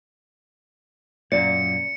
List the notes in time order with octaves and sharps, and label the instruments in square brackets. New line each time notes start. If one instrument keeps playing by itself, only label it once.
[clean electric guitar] F#2 A#2 A#3 [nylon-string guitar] D5 [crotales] C#7